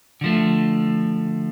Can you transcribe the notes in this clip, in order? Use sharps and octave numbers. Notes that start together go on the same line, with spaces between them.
D3 F3 A3